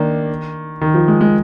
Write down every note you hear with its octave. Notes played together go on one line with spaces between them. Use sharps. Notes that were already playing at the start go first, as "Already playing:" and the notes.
Already playing: D#3 A#3 D4
D#3
F3
G#3
G#3